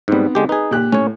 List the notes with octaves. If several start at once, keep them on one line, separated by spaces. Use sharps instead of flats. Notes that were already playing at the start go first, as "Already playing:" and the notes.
G#2 G3 B3 C4 D#4
D3 G#3 G4
D#4 G#4 B4
A#2 G4 F#6
A2 C#4 C#5